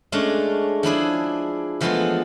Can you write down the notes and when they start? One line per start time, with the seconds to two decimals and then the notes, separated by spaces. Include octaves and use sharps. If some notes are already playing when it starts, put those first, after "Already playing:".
0.12 G#3 A3 C#4 D4
0.83 F3 D4 E4 G#4
1.81 E3 F3 G#3 A3 B3 F4